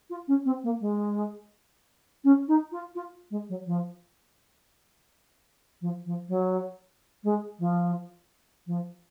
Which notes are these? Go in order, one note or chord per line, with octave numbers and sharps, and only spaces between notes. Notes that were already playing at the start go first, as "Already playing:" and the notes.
F4
C#4
C4
A#3
G#3
C#4
D#4
F4
F4
G#3
F#3
F3
F3
F3
F#3
G#3
F3
F3